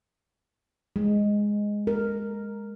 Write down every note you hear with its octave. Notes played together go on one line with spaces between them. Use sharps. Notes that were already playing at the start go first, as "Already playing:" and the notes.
G#3
A#4